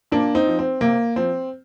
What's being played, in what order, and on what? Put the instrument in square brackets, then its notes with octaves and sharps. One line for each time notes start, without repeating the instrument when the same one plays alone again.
[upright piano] A#2 A#3 D4
C4 D#4
F3
C4
C3 A#3
F3 C4